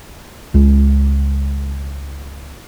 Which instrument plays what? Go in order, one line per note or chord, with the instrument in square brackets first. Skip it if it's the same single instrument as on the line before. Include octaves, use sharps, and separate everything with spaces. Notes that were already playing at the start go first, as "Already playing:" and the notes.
[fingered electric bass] C#2 G#3